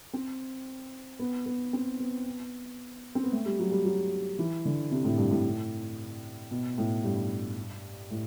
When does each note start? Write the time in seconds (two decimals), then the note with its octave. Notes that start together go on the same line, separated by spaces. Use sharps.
0.13 C4
1.19 B3
1.46 B3
1.73 C4
2.00 B3
3.15 C4
3.23 B3
3.32 A3
3.46 G3
3.59 F#3
3.71 G3
3.85 F#3
4.39 E3
4.65 D3
4.92 C3
5.04 A2
5.18 G2
5.31 A2
6.51 B2
6.78 A2
7.04 G2
8.10 A2